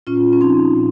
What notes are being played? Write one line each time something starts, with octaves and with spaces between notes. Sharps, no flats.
A#2 C#4 F4
C#4
F3 C4 D#4
A#2